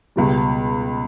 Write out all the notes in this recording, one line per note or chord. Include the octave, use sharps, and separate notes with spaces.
C#2 B2 G3